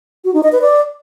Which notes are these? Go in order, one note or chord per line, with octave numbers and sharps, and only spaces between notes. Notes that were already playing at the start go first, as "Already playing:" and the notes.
F#4
D#4
D#5
B4
D5